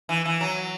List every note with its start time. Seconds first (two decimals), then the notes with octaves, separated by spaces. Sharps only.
0.09 E3
0.25 E3
0.41 F#3